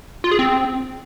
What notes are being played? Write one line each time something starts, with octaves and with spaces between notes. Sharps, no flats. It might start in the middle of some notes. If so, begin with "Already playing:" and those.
F4
G#4
C4